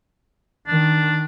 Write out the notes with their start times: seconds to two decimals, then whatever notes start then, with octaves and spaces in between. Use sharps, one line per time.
0.68 D#3 D4